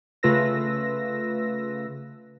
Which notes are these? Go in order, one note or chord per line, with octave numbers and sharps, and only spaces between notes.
C#3 A3 F4 B4 E6 A#6